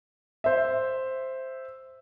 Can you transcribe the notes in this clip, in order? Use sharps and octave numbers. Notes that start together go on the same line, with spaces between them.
C5 E5